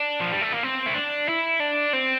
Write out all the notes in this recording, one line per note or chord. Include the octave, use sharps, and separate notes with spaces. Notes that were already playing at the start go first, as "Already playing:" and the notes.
Already playing: D4
F3
G3
A3
A#3
C4
E4
D4
E4
D4
C4